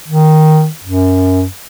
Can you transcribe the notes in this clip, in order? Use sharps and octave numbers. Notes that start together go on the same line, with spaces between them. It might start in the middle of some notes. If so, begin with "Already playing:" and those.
D#3
F#2